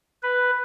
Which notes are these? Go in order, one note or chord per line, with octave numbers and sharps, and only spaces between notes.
B4